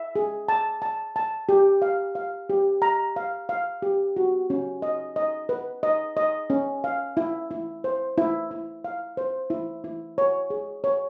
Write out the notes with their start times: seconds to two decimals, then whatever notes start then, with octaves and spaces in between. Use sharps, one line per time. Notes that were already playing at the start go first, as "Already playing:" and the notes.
Already playing: E5
0.16 G#4
0.48 A5
0.82 A5
1.16 A5
1.49 G4
1.82 F5
2.15 F5
2.50 G4
2.82 A#5
3.16 F5
3.49 F5
3.82 G4
4.17 F#4
4.50 C#4
4.82 D#5
5.16 D#5
5.49 B4
5.83 D#5
6.17 D#5
6.50 C#4
6.84 F5
7.17 E4
7.51 E4
7.84 C5
8.18 E4
8.51 E4
8.84 F5
9.17 C5
9.50 E4
9.84 E4
10.18 C#5
10.50 G#4
10.84 C#5